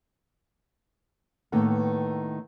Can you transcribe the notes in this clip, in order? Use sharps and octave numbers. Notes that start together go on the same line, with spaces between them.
A2 D#3 A#3 B3 A4